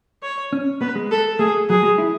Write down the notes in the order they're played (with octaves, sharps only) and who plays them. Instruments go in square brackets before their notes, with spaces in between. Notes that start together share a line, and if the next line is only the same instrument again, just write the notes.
[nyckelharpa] C#5
[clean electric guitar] C#4
[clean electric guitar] B3 [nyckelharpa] B4
[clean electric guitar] G#3
[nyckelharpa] A4
[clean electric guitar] A3 [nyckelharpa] G#4
[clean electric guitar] F#3 [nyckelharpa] G#4
[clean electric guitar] G#3
E4